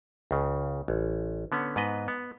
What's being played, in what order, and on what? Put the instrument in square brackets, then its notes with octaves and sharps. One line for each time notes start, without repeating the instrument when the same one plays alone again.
[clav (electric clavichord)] C#2 C#3
A1
D3 B3 C#4
G#2 B3 B4 D#5
B3